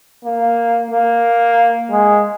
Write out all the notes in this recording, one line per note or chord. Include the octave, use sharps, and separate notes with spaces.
A#3
A#3
G#3